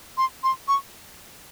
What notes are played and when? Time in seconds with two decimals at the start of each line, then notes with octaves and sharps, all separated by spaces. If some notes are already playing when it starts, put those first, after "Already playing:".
0.17 C6
0.43 C6
0.68 C#6